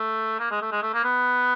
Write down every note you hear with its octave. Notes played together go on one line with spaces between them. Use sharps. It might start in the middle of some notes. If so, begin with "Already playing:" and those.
Already playing: A3
A#3
G#3
A3
G#3
A3
A#3
B3